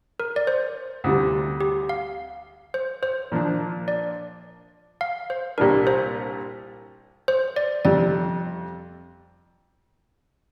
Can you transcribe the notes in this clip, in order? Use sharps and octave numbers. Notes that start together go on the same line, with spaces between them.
A#4
D5
C5
D2 C3 G3
G4
F5
C5
C5
A#2 F3 D4
D5
F5
C5
C2 A#2 G3 D4 A#4
C5
C5
D5
F2 C3 G3 D5